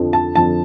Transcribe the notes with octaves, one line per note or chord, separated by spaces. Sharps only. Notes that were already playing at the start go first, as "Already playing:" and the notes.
Already playing: F2 D3 F3
A5
F2 D3 F3 A5